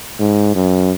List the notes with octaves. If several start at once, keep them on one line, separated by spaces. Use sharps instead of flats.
G#2
F#2